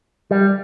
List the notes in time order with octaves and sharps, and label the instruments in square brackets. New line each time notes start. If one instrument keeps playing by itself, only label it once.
[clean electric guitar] G3